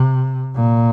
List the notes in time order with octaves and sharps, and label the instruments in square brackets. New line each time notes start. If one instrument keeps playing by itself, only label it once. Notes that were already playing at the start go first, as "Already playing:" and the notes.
Already playing: [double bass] C3
A#2